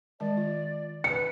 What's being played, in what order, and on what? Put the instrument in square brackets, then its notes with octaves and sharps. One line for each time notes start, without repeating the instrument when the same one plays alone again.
[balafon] D#3 G#3 A5 [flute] D5
[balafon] F4
[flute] B4 [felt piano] C#7